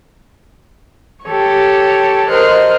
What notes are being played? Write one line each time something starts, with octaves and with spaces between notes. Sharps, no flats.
G4 A4 C#5
A#4 C5 D#5 F6 F#6